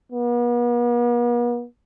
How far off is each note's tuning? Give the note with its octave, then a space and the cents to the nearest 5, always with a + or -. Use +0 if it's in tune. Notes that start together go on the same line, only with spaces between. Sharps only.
B3 -45